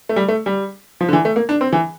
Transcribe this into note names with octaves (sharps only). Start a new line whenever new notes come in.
A3
G3
A3
G3
F3
D3
E3
A3
A#3
D4
C4
E3